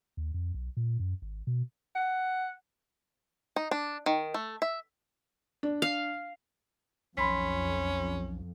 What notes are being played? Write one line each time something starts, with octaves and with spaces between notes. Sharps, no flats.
D#2
F2
B1
A#2
F#2
G#1
B2
F#5
D#4
D4
D#3
A3
E5
D4
F5
B1 F2 C#4 B5 C6 B6